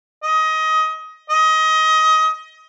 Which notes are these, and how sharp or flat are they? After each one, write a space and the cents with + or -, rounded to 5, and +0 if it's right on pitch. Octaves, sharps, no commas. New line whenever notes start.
D#5 +20
D#5 +25